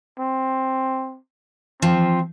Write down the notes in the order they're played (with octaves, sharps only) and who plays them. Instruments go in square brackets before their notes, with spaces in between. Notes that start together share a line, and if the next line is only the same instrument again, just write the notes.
[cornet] C4
[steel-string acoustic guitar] F3 [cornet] C4